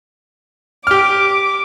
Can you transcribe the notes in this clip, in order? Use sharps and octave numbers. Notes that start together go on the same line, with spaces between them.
G4 D6 F6